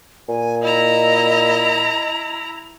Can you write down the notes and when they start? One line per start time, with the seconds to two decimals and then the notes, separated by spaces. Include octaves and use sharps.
0.29 A#2 G#5
0.63 E4 D#5 A#5